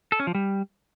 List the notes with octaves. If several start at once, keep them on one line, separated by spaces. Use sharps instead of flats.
A4
C#4
F3
G3